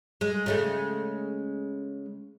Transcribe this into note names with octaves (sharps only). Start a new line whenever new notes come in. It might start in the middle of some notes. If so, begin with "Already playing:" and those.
G#3
C#3 G#3 A3